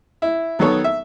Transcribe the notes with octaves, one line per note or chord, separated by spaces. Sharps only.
E4
D#3 F#3 B3 A4 C#5
E5